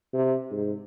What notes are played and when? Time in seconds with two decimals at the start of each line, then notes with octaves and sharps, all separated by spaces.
0.13 C3
0.51 G#2